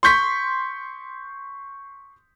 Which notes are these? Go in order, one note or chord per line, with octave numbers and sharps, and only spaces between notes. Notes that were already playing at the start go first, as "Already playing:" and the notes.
C6 C#6 G6 B6